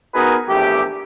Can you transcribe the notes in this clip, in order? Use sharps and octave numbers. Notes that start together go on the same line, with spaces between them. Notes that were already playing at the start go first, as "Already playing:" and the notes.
B3 D#4 F#4 G#4 A#4 B4
A#1 E2 A3 G4